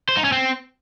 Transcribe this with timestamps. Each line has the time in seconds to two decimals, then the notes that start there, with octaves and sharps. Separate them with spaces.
0.09 C5
0.17 D#4
0.24 C#4
0.32 C4